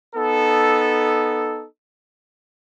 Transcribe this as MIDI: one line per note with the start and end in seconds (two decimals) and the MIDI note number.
0.15 1.65 59
0.15 1.65 63
0.15 1.65 69